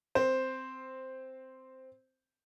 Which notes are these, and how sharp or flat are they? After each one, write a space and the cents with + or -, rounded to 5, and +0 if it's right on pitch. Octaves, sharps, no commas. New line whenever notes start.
C4 -5 C5 +0